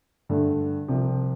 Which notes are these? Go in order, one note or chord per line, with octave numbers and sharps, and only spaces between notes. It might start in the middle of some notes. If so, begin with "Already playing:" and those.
G2 D3 A3
C2 C3 F3